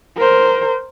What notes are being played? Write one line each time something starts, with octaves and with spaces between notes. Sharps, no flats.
A#4 C5